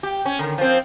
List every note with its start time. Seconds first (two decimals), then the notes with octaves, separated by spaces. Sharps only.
0.03 G4
0.25 C#4
0.39 D3 D#3
0.58 F3 C4